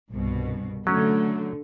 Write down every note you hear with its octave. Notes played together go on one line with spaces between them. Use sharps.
C2 G2 B2
D3 F#3 A3 C#4